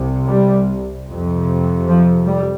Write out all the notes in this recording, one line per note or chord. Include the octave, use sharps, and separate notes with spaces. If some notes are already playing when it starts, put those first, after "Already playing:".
Already playing: C2 C3
G3
F2 C3
F3
G3